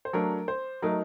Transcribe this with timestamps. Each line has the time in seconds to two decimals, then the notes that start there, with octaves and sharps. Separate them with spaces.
0.05 C5
0.13 F#3 A3 D4 A#4
0.48 C5
0.82 F#3 A3 D#4 A#4